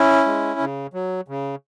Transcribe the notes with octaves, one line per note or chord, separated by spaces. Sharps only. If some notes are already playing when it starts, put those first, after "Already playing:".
Already playing: C#4 E4
G#3
C#3
F#3
C#3